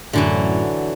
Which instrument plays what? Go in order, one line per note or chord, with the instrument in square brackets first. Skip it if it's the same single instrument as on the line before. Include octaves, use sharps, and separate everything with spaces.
[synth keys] F#2 A2 [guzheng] D3 E3 F#3